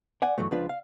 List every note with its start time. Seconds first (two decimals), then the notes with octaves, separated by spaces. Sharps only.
0.22 D5 F#5 G#5
0.38 G2 C3 E3 F#3 A3
0.51 C#2 F3 D4 F4 B4
0.69 F5